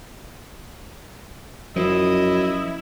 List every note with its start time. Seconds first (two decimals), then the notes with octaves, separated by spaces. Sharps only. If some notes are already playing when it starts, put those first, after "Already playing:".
1.76 F#2 F3 E4 D#5